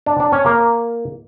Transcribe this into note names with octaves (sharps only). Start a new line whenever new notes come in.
D4
D4
C#4
A#3